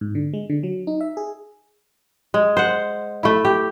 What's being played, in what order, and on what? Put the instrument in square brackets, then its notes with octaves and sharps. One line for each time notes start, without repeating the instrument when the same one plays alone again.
[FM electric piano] G#2
D3
G#3
D3
F#3
D#4
E5
G#4
[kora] G#3
C5 F#5
A3 E4
G4